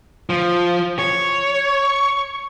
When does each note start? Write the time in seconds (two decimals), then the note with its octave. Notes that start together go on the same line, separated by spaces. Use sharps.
0.30 F3
0.99 C#5